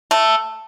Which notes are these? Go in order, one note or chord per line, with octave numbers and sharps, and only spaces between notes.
A3